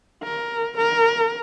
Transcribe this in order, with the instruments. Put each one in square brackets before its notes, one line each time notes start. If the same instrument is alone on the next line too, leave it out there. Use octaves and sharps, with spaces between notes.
[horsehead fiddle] A#4
A#4